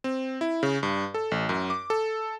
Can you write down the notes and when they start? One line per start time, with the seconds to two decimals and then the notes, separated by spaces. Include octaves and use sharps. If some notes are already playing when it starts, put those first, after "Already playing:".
0.04 C4
0.41 E4
0.63 C#3
0.83 G2
1.14 A4
1.31 A1
1.49 F#2
1.70 D6
1.90 A4